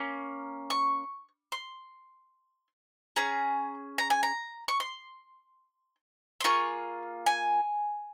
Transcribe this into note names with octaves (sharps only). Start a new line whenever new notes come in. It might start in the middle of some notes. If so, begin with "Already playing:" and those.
Already playing: A#3 C#4
C#6
C6
C#4 G#4 A#5
A#5
G#5
A#5
C#6
C6
C6
A#3 F4 G#4 C#6
G#5